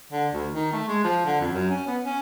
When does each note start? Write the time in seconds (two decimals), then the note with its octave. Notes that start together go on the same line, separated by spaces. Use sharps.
0.12 D3
0.33 D2
0.54 D#3
0.73 A3
0.88 G#3
1.04 F3
1.26 D3
1.41 F2
1.53 F#2
1.71 C#4
1.87 B3
2.05 C#4